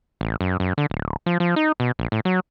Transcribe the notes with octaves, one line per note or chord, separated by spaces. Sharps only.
A1
F#2
F#2
D3
D1
F3
F3
D#4
B2
A#1
A2
F#3